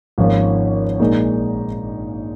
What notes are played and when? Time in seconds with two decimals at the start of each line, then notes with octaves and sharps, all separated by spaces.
0.18 G#1 G#2 F3 A#3 C#4
1.00 A#1 A#2 G#3 D#4 A#4